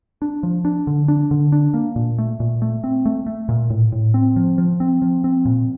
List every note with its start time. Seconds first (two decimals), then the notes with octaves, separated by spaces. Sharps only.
0.22 D4
0.43 F3
0.65 D4
0.87 D3
1.08 D4
1.31 D3
1.52 D4
1.74 A#3
1.96 A#2
2.18 A3
2.40 A#2
2.62 A3
2.84 C4
3.06 A3
3.27 A3
3.49 A#2
3.70 A2
3.92 A2
4.14 C4
4.36 F3
4.58 F3
4.80 C4
5.02 F3
5.24 C4
5.45 A#2